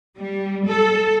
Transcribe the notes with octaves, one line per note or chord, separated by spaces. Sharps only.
G3
A4